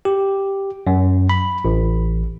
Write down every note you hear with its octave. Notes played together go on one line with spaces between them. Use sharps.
G4
F#2
B5
A1